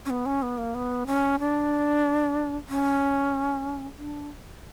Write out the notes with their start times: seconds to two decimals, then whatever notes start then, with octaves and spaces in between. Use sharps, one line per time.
0.05 C#4
0.10 B3
0.26 C#4
0.42 B3
0.58 A#3
0.75 B3
1.07 C#4
1.40 D4
2.69 C#4
3.98 D4